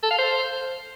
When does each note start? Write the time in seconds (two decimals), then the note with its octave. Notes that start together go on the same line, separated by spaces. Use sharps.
0.03 A4
0.11 F5
0.18 C5